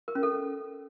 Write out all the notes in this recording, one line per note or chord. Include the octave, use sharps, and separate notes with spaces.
A#4
C#4
A4